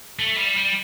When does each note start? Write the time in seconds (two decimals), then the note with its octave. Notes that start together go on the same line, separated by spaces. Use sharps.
0.19 A3
0.38 G3
0.57 G3